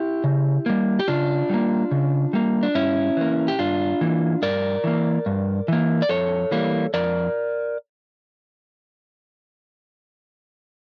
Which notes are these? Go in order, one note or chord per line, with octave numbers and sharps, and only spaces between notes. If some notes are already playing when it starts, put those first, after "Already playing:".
Already playing: E4 G4
C#3
G3 A#3
G4
C#3 D4 F4
G3 A#3
C#3
G3 A#3
D4
G2 C#4 E4
E3 A#3
G4
G2 D4 F4
E3 A#3
G2 A#4 D5
E3 A#3
G2
E3 A#3
D5
F2 A4 C#5
E3 G3 A#3
F2 A#4 D5